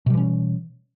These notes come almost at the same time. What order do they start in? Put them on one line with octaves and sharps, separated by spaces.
B2 G3 E3 C#4